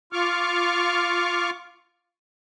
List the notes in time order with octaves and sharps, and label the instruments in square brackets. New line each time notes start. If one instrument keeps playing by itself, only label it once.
[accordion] F4 C#6 D6 F6